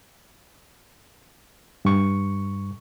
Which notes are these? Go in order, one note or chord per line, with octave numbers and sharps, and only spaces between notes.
G2 C#6